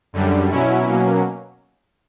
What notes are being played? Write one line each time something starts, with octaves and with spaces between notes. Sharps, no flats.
F#2 D3 G3
B2 F#3 C#4 E4
B2 F#3 A#3 C#4